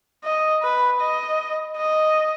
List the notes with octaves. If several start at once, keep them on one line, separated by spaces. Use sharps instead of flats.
D#5
B4
D#5
D#5